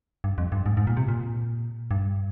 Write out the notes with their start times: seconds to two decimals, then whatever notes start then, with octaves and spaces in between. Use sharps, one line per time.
0.24 G2
0.38 F2
0.52 G2
0.66 G#2
0.77 G#2
0.87 A#2
0.97 C3
1.08 A#2
1.91 G2